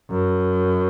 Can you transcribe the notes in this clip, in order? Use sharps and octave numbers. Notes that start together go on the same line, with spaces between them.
F#2